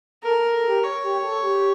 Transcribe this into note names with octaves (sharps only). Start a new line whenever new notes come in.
A4 A#4
A4
G4
C#5
G4
A4
G4